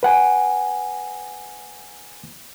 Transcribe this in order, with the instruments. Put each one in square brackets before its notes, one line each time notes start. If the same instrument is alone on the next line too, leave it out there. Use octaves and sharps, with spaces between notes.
[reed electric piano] B4 F#5 G#5